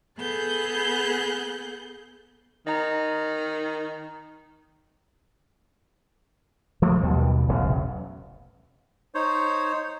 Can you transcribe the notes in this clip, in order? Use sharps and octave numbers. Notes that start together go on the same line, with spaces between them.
B3 G#4 A4 F#6 G6
D#3 D#5 A#5
F3 A3 A#3
D#2 B2 G3
E1 A1 C#3 F#3
D#4 C5 C#5